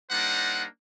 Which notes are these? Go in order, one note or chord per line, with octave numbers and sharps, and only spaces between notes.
G3 A#3 D4 D#4 C5 F#5